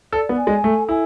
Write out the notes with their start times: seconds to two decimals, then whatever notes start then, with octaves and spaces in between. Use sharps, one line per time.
0.12 A4 D5
0.29 B3
0.37 G#5
0.47 G#3
0.64 A3 A4
0.89 E4 G#5